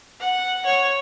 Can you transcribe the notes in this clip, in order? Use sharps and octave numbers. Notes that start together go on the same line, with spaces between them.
F#5
C#5